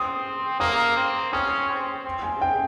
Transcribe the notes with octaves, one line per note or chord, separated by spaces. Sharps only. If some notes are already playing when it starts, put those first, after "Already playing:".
Already playing: C4 D#6
A#3 D#6
C4
C#4 D#6
C4
C4
G#5
G5